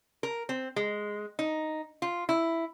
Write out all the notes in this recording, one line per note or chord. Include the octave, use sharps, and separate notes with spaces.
A#4
C4
G#3
D#4
F4
E4